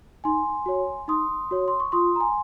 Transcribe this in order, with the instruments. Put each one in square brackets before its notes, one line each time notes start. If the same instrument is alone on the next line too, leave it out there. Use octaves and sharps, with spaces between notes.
[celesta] D#4 G#5 C6
F#4 C#5
D#4 C6 D#6
F#4 C#5
C6
C#6
F4 C6 D#6
A#5
G#5 C6